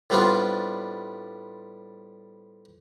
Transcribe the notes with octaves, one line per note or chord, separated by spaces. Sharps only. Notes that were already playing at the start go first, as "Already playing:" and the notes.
A2 G3 B3 C4 D4 F4